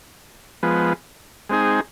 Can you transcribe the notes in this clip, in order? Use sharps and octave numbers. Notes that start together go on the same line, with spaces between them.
F3 G#3 B3
G#3 C4 D#4 G#4